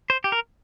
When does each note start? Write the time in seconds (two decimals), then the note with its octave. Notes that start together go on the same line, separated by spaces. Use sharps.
0.10 C5
0.24 G4
0.32 A#4